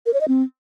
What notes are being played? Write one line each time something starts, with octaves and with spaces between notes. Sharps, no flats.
A#4
C#5
D#5
C4